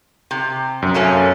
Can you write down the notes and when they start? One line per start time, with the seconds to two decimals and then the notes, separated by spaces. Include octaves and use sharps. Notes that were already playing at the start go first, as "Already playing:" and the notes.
0.31 C3
0.82 F#2
0.94 A3 A#3 C#4